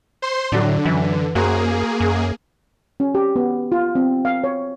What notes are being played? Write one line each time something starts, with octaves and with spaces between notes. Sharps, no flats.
C5 C6
A2 D3 F#3 D4
F#2 E3
F#2 A#3 F#4 G#4 C5 A#5
F#2
C#4
G4
B3
F4
C4
F5
C#5